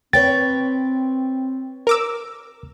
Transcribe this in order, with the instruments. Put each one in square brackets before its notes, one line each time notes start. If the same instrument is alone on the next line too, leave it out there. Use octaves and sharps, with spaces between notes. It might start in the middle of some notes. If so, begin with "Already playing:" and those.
[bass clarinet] C4 [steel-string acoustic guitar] B4 C#5 G5 [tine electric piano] A6
[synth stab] A#4 D6 E6